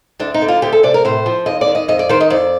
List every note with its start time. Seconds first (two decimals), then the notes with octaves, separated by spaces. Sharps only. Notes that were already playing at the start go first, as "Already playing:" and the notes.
0.19 D2 D4
0.34 D#4
0.42 D3
0.48 F4
0.62 D2 G4
0.72 A4
0.83 C3 D5
0.94 A#4
1.05 A2 C5
1.26 F3
1.46 D#2 D#5
1.61 D5
1.68 D#3
1.75 D#5
1.88 F2 D#5
1.99 D5
2.09 D#3 C5
2.20 D#5
2.30 F2 D5